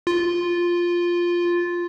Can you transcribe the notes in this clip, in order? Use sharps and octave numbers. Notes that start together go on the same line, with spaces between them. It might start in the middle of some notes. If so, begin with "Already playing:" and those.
F4